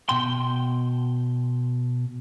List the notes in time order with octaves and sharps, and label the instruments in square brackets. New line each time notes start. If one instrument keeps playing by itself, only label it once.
[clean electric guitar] B2 G5 C6